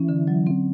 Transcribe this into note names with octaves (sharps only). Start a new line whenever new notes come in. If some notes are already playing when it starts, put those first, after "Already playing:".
Already playing: E3 C#4
D3
F#3
C4